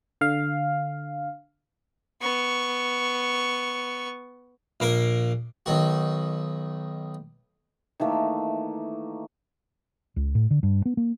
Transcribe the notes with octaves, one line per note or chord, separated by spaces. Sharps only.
D3 F5
B3 C#6
A#1 A#3 A#4
B1 D#3 F#4
D#3 E3 A3 A#3
C#2
A2
D3
G2
B3
A#3